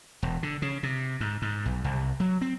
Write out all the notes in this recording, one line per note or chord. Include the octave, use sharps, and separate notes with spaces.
E1
D3
C#3
C3
G#2
G#2
B1
C2
F#3
C4